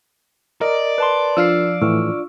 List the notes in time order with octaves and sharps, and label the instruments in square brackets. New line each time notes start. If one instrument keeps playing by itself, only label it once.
[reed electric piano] A#4 [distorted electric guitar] D5 [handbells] D#5
[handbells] B4 A5 C6
[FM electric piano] F3 D4 F4 [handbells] E6 F6 C7
[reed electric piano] A2 E3 [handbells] C#6 E6 F6